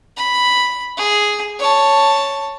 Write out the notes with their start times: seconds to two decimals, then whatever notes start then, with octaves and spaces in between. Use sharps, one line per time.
0.17 B5
0.97 G#4
1.60 C#5 A5